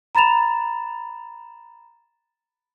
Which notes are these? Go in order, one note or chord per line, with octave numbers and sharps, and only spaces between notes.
A#5 B5 A6 E7 F7